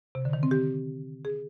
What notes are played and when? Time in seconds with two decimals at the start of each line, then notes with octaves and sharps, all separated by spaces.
0.15 C3
0.25 D3
0.33 D#3
0.43 C4
0.51 G4
1.25 G#4